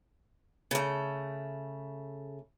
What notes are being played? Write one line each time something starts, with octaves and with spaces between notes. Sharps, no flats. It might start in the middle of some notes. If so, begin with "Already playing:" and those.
C#3 A3